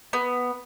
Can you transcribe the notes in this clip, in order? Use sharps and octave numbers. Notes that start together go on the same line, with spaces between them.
B3